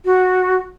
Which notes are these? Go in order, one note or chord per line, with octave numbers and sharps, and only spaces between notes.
F#4